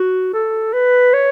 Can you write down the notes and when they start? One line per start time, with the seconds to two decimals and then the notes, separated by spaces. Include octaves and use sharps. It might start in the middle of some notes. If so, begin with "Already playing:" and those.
Already playing: F#4
0.34 A4
0.73 B4
1.14 C#5